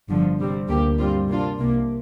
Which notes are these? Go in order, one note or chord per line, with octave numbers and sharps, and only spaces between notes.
G1 G2 D3 F3
C3 G3 C4
D2 D3 A#3 G4
G2 G3 C4 F4
C3 A#3 D4 F4
C2 C3 A#3